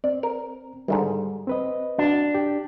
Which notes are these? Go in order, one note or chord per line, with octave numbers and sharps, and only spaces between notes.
C4 D5
A#4
G#2 D3 D#3 G3
C4 B4 D#5
D4 F#4
G4